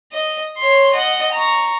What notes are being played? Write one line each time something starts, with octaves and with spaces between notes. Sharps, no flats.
D#5
C#5 C6
D#5 F#5
A#5 C#6